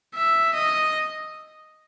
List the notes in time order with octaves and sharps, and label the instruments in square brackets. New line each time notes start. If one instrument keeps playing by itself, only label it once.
[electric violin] E5
D#5